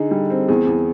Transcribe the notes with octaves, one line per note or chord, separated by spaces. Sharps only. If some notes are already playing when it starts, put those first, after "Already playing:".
Already playing: D3 D#4 G#4
G3
C4
E2 G#4
E2